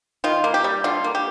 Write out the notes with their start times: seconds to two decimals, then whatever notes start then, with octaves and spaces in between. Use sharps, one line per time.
0.24 D#3 F4
0.44 A#3
0.54 G4
0.64 G3
0.84 D3 F4
1.04 A#3
1.15 G4